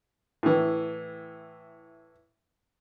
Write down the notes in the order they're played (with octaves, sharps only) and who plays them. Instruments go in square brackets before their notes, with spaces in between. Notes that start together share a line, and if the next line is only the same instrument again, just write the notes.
[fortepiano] A2 E3